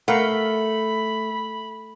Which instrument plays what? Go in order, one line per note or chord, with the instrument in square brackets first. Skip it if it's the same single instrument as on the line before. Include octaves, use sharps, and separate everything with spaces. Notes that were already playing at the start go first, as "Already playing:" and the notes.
[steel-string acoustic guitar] A3 [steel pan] A#4 F5 F#5 [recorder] B5